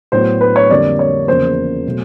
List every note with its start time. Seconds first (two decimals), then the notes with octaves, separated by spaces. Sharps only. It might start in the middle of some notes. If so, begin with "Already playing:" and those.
0.12 A2 F#3 B3 C5
0.41 B4
0.56 C#5
0.70 F2 D3 G3 A#3 D5
0.99 C#5
1.28 E2 C#3 F3 A#3 C5
1.87 B2 F#3 A3